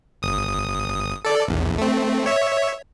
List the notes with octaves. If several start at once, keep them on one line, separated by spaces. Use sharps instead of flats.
G1 D#6
A4 D5
A#1 E2
A3 C4
C#5 E5